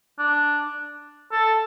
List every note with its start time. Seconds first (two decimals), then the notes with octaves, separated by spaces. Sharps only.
0.19 D4
1.31 A4